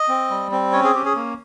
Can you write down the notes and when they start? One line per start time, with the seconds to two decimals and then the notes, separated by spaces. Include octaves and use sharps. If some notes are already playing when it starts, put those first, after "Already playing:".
Already playing: D#5
0.09 C4
0.30 G3
0.52 C4
0.73 C#4 C#5
0.84 G#4
0.95 C#4 G4
1.05 G#4
1.16 A#3